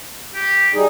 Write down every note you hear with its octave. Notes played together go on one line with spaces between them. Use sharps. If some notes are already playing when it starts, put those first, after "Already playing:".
G4
G3 D#4 G#4